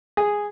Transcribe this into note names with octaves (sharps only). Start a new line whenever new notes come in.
G#4